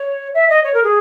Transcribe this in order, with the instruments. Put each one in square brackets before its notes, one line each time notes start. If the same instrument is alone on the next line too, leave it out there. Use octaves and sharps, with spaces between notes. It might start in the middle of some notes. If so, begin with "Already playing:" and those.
Already playing: [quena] C#5
E5
D#5
C#5
A#4
G#4